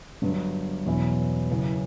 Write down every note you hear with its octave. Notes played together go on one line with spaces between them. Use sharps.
G1 G2 F#3
E2 B2 F#3 C#4 E4
F#1 F#2 C#3 E3